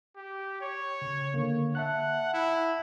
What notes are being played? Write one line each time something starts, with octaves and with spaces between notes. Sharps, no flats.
G4
C#5
C#3
D3 A#3
E5 F#5 A5 F#6
E4